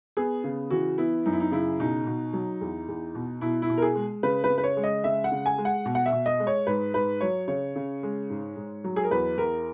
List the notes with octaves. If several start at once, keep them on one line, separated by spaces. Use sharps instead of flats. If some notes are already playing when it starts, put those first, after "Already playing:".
B3 G#4
C#3
E3 F#4
B3 E4
F#2 D#4
E4
D#4
C#3 E4
B2 D#4
B2
F#3
E2
E2
B2
B2 E4
E4
B2
A#4
G#4
G#3
C#3 B4
B4
C#3
B4
C#5
G#3
D#5
C#3 E5
F#5
C#3
G#5
G#3
F#5
B2
F#5
E5
B2
D#5
G#3
C#5
G#2 B4
G#2 B4
F#3 C#5
C#3 C#5
C#3
G#3
G#2
G#2
F#3
G#4
A#4
E2 B4
E2 A#4